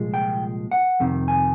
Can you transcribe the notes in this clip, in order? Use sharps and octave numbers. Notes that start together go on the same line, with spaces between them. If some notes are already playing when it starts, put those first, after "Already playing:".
Already playing: C2 A#2 F3 G#3
G5
F#5
F2 C3 D#3
G#5